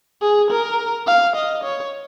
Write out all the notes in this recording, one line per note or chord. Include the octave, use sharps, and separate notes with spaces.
G#4
A#4
F5
D#5
C#5